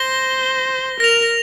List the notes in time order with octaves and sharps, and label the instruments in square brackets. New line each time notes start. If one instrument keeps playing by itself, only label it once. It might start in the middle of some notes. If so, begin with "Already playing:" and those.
Already playing: [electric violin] C5 [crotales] A#6 G7
[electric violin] A#4 [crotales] A#6 F7